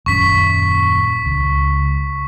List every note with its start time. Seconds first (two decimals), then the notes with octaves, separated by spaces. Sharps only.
0.06 D#1 F#2 C#4 C#6 B6
1.26 C#2